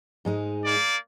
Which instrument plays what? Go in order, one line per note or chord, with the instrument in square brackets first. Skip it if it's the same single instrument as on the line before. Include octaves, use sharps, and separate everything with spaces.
[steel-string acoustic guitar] G#2 G#3 D#4
[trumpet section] A#3 D5